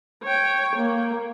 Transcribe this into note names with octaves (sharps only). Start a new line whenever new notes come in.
C#5 G5
A#3